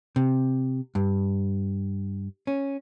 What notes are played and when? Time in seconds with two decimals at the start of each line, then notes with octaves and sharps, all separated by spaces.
0.16 C3
0.95 G2
2.47 C#4